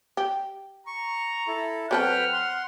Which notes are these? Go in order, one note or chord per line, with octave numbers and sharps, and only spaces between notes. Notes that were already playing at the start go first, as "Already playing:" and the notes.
G4
A#5 C#6
E4 A4
F#3 C4 A4 B4 F#5 G5 F6
F#5 C6